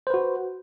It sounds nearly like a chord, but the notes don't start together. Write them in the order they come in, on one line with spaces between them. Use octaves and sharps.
C5 B4 F#4